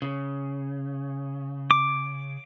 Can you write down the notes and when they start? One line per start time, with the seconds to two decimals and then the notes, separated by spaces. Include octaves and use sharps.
0.02 C#3
1.71 D6